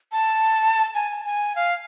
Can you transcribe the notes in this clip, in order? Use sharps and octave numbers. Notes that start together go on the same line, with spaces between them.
A5
G#5
G#5
F5